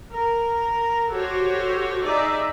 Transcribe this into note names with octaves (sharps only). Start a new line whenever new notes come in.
A#4
F#4 G4 A4 C5 C#5
D#4 G#4 D5 E5